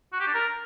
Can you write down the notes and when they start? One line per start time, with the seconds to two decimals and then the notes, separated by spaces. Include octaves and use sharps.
0.13 F#4
0.20 G4
0.27 D4
0.34 A#4